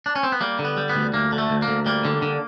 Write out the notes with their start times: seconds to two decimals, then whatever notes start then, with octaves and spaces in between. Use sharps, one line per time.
0.06 D4
0.16 C#4
0.23 C4
0.32 B3
0.41 G3 A#3
0.59 D3
0.65 B3
0.77 G3
0.90 B3
0.95 D2
1.14 D2 A#3
1.32 D3
1.38 A3
1.50 D2
1.62 A#3
1.68 D2
1.86 G3 A#3
2.05 D3
2.22 D3